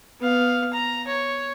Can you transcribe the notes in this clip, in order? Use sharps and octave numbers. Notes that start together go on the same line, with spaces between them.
B3 F5
A#5
C#5